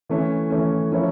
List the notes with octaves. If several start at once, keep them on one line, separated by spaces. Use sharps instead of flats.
E3 A3 C#4
E3 A3 C#4
F3 C#4 E4 A#4 C#5